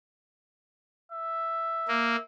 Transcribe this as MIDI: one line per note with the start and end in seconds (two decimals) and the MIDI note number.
1.12 2.22 76
1.88 2.16 58